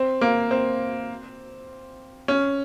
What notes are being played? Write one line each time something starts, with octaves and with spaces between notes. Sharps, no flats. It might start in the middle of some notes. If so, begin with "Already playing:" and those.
Already playing: C4
A#3
C4
C#4